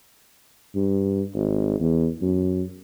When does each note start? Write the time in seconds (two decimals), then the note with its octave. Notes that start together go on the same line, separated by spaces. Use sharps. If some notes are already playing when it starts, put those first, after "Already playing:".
0.75 G2
1.34 G#1
1.80 E2
2.22 F#2